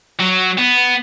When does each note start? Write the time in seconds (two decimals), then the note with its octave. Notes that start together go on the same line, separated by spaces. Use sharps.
0.20 F#3
0.58 B3